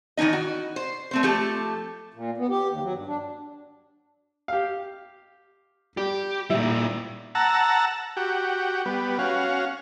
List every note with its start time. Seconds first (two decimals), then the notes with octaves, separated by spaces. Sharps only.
0.17 D#3 E3 G#3 D#4 D#5
0.33 F#4
0.76 C5
1.11 A3 C4 C5
1.23 F3 A3 G4 A4
2.14 A#2
2.37 B3
2.49 G4
2.68 D#2
2.82 F#3
2.93 G2
3.07 D4
4.48 G4 F5
5.97 G3 G4
6.50 A#2 G3 E4
7.35 F#5 A5 A#5 E6
8.17 F#4 G4
8.86 G3 B3
9.19 C#4 F#4 F5